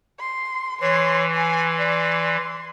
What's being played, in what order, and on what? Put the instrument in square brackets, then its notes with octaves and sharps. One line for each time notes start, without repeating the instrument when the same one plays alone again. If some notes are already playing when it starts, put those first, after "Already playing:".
[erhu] C6
[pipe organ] E3 [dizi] C#5 [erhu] C6
[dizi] G#5 [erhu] C6
[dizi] D5